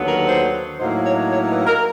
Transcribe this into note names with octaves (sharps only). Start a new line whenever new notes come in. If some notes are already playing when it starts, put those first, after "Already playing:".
Already playing: D#2 D3 F#3 B3
A#4
C5
A2 F#3 A#3 D#4 C5
C#5
C#5
B4
A#4